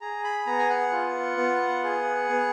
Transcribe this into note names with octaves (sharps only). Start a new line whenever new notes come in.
G#4 A#5
B5
B3 A#5
G#5
F#5
F4
B3
G#4
B3